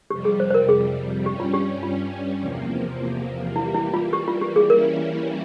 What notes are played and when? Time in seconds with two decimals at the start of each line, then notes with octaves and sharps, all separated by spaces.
0.10 F2 C3 G3 G4
0.25 G#4
0.40 C5
0.50 C5
0.54 A#4
0.69 G#4
1.26 G2 G3 C#4 G4
1.40 F4
1.54 G4
1.83 F4
2.40 E2 C3 F3 A#3
3.55 E3 G3 A#3 E4
3.74 E4
3.94 F4
4.13 G4
4.28 F4
4.41 G4
4.56 G#4
4.70 E3 G3 A#3 C#4 E4 A#4